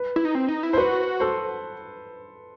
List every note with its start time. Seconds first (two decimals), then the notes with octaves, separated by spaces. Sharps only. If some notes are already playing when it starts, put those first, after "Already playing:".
Already playing: B4
0.16 E4
0.25 D#4
0.35 C4
0.48 D#4
0.63 E4
0.73 C5
0.78 F#4 B4
1.20 A4 C5